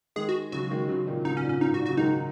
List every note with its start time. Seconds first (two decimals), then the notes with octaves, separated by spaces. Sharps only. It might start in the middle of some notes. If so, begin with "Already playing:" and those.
0.16 D#3 G#3 G#4
0.29 F#4
0.52 C#3 F#3 F#4
0.71 D#3 G#3
0.88 C#3 F#3
1.07 A#2 D#3
1.25 G#2 C#3 D#4
1.37 C#4
1.43 A#2
1.49 C#4
1.61 A#2 D#4
1.70 G#2
1.74 F#4
1.80 A#2
1.86 C#3 F#3 F#4
1.97 D#3 G#3 D#4